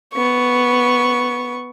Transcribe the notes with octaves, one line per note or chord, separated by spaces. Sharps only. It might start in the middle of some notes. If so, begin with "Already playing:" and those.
B3 C#6